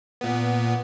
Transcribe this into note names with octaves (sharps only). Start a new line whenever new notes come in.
A#2 B3